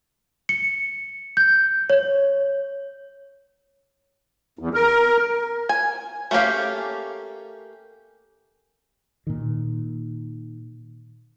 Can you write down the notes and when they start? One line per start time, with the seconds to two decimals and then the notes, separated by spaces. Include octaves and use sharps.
0.49 C#7
1.37 G6
1.90 C#5
4.59 E2
4.74 A#4
5.69 G#5
6.31 A3 A#3 C#4 G4 F5
9.27 A#2 D#3